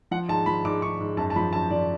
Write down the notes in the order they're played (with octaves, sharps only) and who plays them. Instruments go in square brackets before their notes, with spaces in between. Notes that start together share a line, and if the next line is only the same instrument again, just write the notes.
[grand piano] F3 F#5
G#2 A5
F3 B5
G#2 D6
G#2 C#6
G#2
F#2 A5
A5
F3 B5
F#2 A5
F3 D5